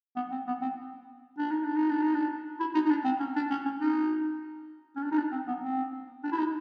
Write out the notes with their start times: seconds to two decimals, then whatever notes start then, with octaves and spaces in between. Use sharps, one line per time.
0.16 B3
0.31 C4
0.47 B3
0.62 C4
1.38 D4
1.51 D#4
1.64 D4
1.76 D#4
1.90 D4
2.02 D#4
2.14 D4
2.60 E4
2.75 D#4
2.85 D#4
2.90 D4
3.04 C4
3.20 C#4
3.36 D4
3.50 C#4
3.65 C#4
3.81 D#4
4.96 C#4
5.03 D4
5.12 D#4
5.18 D4
5.32 C4
5.48 B3
5.64 C4
6.24 D4
6.32 E4
6.39 D#4